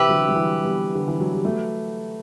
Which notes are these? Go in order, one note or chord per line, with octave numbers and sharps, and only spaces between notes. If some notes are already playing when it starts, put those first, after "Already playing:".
Already playing: C3 E3 G4 B4 E5
D3 F#3
F#3
E3 G3
G3 B3
D3
E3
F#3
G3
F#3 A3